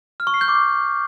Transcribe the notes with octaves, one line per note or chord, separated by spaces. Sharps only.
F6
C#6
C7
G6
D6